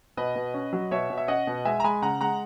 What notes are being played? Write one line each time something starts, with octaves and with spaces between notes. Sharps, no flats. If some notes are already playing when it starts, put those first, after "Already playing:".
B2 B4 D#5
B2
C#4
F#3
B2 C#5 E5
B2
E5
C#4 D#5 F#5
B2
G#3 E5 G#5
A#5
G#3 G#5 B5
C#3 F#5 A#5
G#3 F#5 A#5